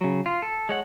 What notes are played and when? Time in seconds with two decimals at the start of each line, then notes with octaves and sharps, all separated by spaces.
0.01 C#3 F#3
0.26 F4
0.42 A4
0.69 G#3 C#5 F#5